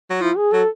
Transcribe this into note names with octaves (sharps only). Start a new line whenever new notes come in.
F#3
F3 E4
G#4
F#3 A4